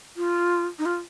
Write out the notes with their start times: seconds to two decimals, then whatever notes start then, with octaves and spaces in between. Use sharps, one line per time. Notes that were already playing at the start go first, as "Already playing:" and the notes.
0.17 F4
0.79 D#4
0.86 F4